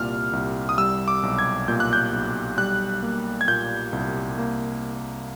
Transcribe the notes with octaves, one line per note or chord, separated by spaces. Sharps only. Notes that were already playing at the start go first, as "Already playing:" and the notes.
Already playing: C2 A#2 G3 F6
C2
D#6
G3 E6
D6
B1
G#6
A#2 G6
F#6
G6
B1
G3 F#6
A#3
G#6
A#2 G6
C2
A#3